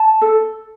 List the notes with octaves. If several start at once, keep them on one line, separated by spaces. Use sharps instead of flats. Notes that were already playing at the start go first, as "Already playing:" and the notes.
Already playing: A5
A4